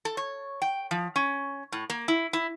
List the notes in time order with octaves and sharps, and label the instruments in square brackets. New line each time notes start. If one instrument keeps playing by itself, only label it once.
[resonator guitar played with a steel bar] A4
C#5
G5
F3
C#4
A2
A#3
E4
E4